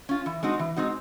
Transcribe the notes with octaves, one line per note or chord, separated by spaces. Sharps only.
C#4 F4
E3
G#3 C4 D#4 F#4
E3
G#3 C4 D#4 F#4